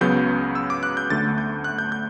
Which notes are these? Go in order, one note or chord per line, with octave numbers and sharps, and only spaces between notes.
C#2 C#3 F#3 B3 G6
E6
D6
F#6
G6
D2 D3 A3 A6
G6
F#6
G6
G6